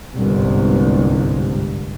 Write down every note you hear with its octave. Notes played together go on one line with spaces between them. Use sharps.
G1 C2 G#2